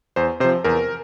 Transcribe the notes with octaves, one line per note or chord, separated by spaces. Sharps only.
E2 C5
C3 F3 C5
E2 A#4